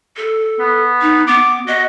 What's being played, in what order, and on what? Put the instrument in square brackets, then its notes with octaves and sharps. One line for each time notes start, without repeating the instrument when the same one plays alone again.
[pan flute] A4
[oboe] B3
[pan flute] D#4
[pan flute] B3 [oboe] D6
[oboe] F#4 [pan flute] D#5